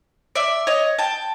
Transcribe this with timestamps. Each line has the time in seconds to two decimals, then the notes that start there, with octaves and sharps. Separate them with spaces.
0.35 D5 E5
0.67 C#5 D#5
0.99 G5 A5